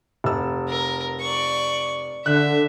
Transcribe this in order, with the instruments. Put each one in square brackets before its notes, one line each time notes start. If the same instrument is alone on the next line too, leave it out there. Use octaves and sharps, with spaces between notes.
[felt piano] F1 E6
[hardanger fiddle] A#4
D5 C#6
[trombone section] D3 [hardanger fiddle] E5 [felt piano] F#6